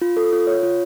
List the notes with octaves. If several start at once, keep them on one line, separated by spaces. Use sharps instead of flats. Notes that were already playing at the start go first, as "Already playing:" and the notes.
F4
A4
F4
C#5
F4